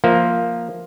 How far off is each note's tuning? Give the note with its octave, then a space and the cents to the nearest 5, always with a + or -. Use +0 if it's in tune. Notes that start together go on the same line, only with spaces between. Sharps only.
F3 +0 A#3 +0 E5 +0